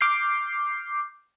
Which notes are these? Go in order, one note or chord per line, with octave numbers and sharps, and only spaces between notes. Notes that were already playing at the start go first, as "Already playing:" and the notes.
D6 F6 G6 C7